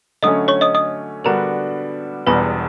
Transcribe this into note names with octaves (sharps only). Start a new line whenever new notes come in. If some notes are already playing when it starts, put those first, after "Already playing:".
D3 F#3 A3 C#4 D#5 D#6
C#5 C#6
D#5 D#6
D#5 D#6
D3 G3 B3 D4 F#4 A#4 A#5
E1 E2 B2 G3 B4 B5